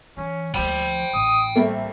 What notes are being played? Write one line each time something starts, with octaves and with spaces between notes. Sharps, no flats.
E3 C#4
D2 F3 C5 G5 B5
A1 D#6
G3 A3 A#3 C4